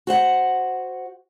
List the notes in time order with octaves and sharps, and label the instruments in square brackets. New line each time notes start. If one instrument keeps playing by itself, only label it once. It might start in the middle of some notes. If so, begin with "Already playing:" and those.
[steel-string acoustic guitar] F#4 C5 F#5